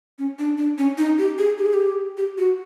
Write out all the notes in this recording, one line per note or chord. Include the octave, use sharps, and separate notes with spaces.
C#4
D4
D4
C#4
D#4
G4
G#4
G4
G#4
G4
G4
F#4